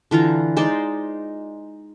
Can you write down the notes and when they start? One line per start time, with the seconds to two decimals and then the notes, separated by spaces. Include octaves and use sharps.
0.11 D3 E3 F4 A#5
0.57 G#3 D#4 C5 D5